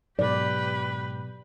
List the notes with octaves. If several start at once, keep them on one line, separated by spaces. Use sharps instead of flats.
G#2 B2 F#3 G4 B4 D5